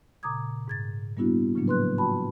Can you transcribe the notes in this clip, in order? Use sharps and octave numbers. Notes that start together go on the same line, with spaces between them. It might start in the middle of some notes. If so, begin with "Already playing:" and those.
A#2 C#3 A#5 D6 D#6 G#6
G#2 G#6 A6
G3 A#3 B3 D4 E4 F#4
A2 C#3 F3 F#3 A#3 D4
B4 C6 F#6
F4 F#4 G5 A5 B5